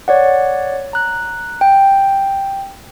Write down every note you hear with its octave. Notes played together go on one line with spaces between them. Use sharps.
C#5 D5 F#5
A#5 F#6
G5